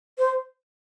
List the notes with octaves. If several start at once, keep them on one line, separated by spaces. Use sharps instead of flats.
C5